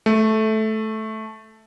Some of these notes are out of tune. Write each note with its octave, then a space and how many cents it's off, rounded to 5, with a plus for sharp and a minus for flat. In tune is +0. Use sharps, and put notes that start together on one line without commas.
A3 -10